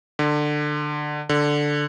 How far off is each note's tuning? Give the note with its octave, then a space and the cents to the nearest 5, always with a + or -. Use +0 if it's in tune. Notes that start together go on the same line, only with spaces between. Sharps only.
D3 +20
D3 +0